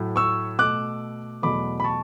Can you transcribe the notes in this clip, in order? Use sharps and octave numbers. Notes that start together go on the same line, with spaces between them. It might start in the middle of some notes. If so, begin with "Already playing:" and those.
Already playing: A2 F#3 A3
C#6 E6
B2 A3 D6 F#6
E2 B2 F#3 A3 B5 D6
B5
A5 C#6